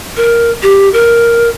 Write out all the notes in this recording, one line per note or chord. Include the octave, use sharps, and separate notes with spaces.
A#4
G4
A#4